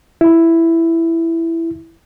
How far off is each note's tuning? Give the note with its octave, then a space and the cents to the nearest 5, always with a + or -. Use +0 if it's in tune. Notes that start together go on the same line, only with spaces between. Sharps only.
E4 +5